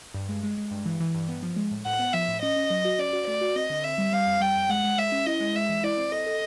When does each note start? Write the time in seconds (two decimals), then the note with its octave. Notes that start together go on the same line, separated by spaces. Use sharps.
0.14 G2
0.29 G#3
0.43 G#3
0.58 G#3
0.71 G2
0.86 E3
1.00 E3
1.14 G2
1.28 B3
1.43 F3
1.56 G#3
1.71 A2
1.86 A2 F#5
1.99 B3
2.13 F3 E5
2.28 A2
2.42 C#4 D#5
2.56 C#4
2.70 F#3
2.85 F#4
2.99 C#4 D5
3.13 F#4
3.27 A3 D5
3.41 F#4
3.56 C4 D#5
3.70 D3
3.84 C4 E5
3.98 G3
4.12 G3 F5
4.27 F2
4.40 G3 G5
4.56 F2
4.69 G#3 F#5
4.84 G#3
4.98 G#3 E5
5.12 C#4
5.26 E4 D#5
5.40 G#3
5.55 G#3 E5
5.69 E3
5.83 E4 D5
5.97 C4
6.12 A4 D#5
6.26 A4